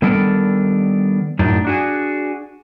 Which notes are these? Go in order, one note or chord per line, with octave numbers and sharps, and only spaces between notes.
D#3 G3 B3 D4 A4 A#4
F#2 A2 D4 D#4
D4 F#4 G#4